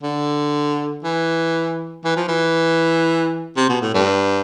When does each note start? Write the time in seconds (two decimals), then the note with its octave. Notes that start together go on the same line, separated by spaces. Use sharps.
0.03 D3
1.04 E3
2.05 E3
2.17 F3
2.28 E3
3.57 C3
3.69 B2
3.82 A2
3.94 G2